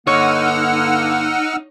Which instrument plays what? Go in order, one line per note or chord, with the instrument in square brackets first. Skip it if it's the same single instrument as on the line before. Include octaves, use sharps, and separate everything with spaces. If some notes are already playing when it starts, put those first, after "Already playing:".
[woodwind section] G2 D3 A#3 [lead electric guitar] D#4 [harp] C#5 [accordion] F#5 E6 F6